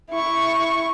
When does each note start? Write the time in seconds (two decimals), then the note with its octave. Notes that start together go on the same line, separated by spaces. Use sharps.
0.11 E4 C#6